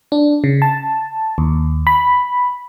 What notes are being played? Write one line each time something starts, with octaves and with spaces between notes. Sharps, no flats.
D4
C#3
A5
D#2
B5